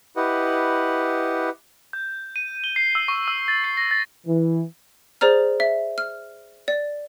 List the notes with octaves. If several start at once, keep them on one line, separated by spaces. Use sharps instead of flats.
E4 G4 B4 D#5 F#5
G6
D#7
G7
C7
E6
C#6
E6
A6
C7
A#6
A6
E3
G#4 C5 D5 A#5 F6
E5
F6
D5